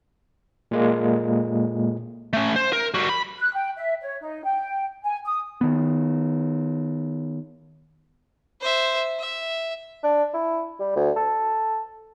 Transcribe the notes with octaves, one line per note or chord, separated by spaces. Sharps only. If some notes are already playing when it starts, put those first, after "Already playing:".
A#2 G#3 A#3
A3 C#4
C5
A#4
G3 F#4
B5
F#6
G5
E5
C#5
D#4
G5
G#5
D#6
D#3 B3
C5 E5
E5
D4
E4
G3
D2
A4